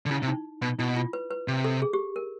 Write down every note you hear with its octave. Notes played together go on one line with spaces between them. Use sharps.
D3
C#3 E4
C3
D#4
B2
B2 E4
F4
B4
B4
C3
A4
G#4
G4
A#4